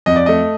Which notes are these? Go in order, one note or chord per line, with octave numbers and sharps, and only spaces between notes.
F2 D#5
D5
A3 D#5